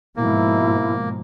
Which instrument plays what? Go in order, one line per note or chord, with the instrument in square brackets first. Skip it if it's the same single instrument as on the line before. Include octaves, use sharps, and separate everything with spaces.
[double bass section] G#2 B2 F3 [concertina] A#3 [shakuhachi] E4